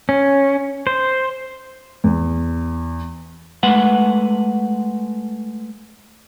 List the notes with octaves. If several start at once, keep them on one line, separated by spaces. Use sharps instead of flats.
C#4
C5
E2
G#3 A3 B4 F#5